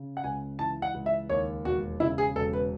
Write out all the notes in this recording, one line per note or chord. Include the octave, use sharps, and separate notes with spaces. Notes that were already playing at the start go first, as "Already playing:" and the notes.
Already playing: C#3
F#5
C#2 G#5
E3 A5
F#5
C#2
E5
D#2 C#5
E1 F#4
C#3 E4
G#4
E1 A4
B4